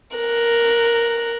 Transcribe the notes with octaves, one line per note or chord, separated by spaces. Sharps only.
A#4 F#6